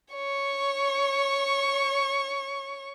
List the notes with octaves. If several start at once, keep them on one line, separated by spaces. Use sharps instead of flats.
C#5 C#6